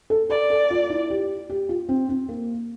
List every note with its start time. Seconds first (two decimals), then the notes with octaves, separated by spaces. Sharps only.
0.10 A4
0.29 A4 D5
0.50 A4
0.70 F4
0.90 E4
1.10 G4
1.49 G4
1.69 F4
1.89 C4
2.09 C4
2.29 A#3